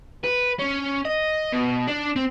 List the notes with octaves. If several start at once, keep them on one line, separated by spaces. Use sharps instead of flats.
B4
C#4
D#5
B2
D4
C4